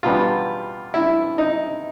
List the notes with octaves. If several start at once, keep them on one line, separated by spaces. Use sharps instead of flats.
E2 B2 G3 B3 F4
E4
D#4